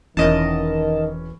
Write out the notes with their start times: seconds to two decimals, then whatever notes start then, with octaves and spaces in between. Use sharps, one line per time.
0.17 E1 D#3 E3 C#4 A#4 D#5 A5